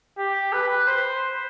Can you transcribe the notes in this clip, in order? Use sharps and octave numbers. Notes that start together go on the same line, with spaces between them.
G4
B4
C5